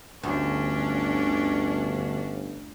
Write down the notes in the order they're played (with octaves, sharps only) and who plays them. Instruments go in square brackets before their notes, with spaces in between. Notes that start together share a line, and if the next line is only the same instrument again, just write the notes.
[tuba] G1 [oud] D2 [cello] C#4 D4